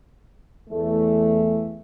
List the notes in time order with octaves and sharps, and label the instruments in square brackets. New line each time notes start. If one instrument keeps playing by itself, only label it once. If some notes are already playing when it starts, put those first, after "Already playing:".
[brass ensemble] E2 E3 A3